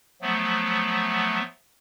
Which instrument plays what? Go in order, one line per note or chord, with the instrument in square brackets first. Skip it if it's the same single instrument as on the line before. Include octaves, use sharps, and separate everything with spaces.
[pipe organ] F3 F#3 A3 B3